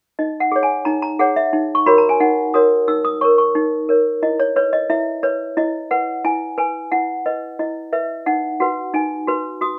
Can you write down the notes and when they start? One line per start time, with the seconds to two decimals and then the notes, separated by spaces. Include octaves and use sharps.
0.19 D#4 D#5
0.40 F#5
0.52 G#4 C#5
0.63 G#5
0.85 D#4 A#5
1.02 A#5
1.19 G#4 C#5 F#5
1.36 E5
1.53 D#4
1.75 C#6
1.86 F#4 A#4 C#5 B5
1.98 A#5
2.09 G#5
2.20 D#4 F#5
2.54 F#4 A#4 C#5 D#6
2.88 D#4 E6
3.05 D#6
3.21 A#4 C#5 C#6
3.38 C#6
3.55 D#4
3.89 A#4 C#5
4.23 E4 D#5
4.39 C#5
4.56 B4 C#5
4.73 D#5
4.90 E4 E5
5.23 B4 C#5
5.57 E4 D#5
5.91 B4 F#5
6.25 E4 G#5
6.58 B4 G#5
6.92 E4 F#5
7.26 B4 D#5
7.59 E4 D#5
7.93 B4 E5
8.26 D#4 F#5
8.60 F#4 B4 F#5
8.94 D#4 G#5
9.27 F#4 B4
9.61 F#4 D#6